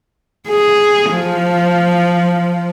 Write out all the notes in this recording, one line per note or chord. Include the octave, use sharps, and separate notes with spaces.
G#4
F3